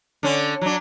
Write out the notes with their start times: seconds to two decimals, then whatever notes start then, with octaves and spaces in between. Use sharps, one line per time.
0.23 D3 C#4
0.61 F#3 D4